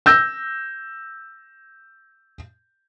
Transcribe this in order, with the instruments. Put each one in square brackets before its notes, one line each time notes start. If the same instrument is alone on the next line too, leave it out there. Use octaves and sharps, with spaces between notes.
[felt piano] E6 G6 A#6